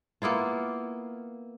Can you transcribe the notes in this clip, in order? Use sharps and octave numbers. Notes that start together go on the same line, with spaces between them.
A#3 B3 E4 F4